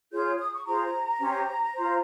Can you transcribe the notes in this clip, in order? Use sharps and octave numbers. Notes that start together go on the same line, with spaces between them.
F4 G#4 C#5 G6
D#6
C#6
F4 G#4 C5 A#5
C#4 G4 C5
F4 C5